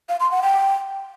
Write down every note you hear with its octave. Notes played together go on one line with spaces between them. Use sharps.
F5
C6
F#5
G5